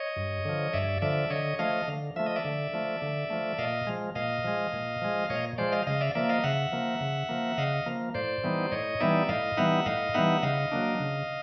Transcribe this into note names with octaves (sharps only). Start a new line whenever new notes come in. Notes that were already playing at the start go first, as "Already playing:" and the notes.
Already playing: C#5 D#5
G2
D3 F3
G2 D5 E5
D3 F3 D5 E5
D3 C#5 D#5
F3 A3 D#5 F5
D3
F3 A3 E5
D#5
D5 E5
D3
F3 A3
D3
F3 A3
A#2 D#5 F5
F3 G#3
A#2 D#5 F5
F3 G#3
A#2
F3 G#3
A#2 C#5 D#5
F3 G#3 C5 D5
D#5 F5
C#3 D#5 F5
D5 E5
F3 A#3 D5 E5
D#5 F5
C#3 E5 F#5
F3 A#3
C#3
F3 A#3
C#3 D#5 F5
F3 A#3
A2 C5 D5
E3 G3 B3 D#4
A2 C#5 D#5
E3 G3 B3 D#4 D5 E5
A2 D#5 F5
E3 G3 B3 D#4 E5 F#5
A2 D#5 F5
E3 G3 B3 D#4 E5 F#5
C#3 D#5 F5
F#3 A#3 D4
C#3